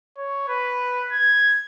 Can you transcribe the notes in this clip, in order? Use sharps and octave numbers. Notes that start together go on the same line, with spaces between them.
C#5
B4
G#6